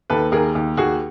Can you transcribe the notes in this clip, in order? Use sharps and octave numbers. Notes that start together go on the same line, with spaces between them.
D#2 A4 B4
D#2 G#4 A#4
D#2
D#2 F#4 G#4